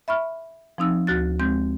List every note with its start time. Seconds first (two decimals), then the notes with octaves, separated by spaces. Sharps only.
0.08 E5 B5 C#6 F6
0.78 F3 C4 D#4 E6
1.07 D2 F#4 F#6 A6
1.40 G#3 C4 G6